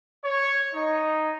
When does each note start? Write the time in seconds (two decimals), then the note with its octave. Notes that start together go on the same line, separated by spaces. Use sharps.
0.25 C#5
0.75 D#4